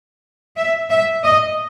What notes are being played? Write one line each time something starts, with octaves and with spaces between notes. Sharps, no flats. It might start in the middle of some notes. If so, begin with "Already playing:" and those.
E5
E5
D#5